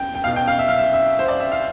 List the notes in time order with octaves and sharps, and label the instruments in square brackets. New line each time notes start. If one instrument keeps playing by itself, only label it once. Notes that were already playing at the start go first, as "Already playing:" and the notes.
Already playing: [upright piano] E1 G5
G5
B1 F5
B2
G5
F5
E5
F5
E5
E5
C5
D5
E5
F5